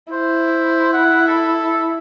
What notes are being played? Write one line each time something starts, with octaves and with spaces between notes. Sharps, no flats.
E4 C5
F#5
A4